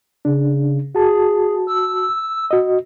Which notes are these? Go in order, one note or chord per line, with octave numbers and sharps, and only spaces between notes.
C#3 D4
F#4 G#4 A5
E6
F#4 D#5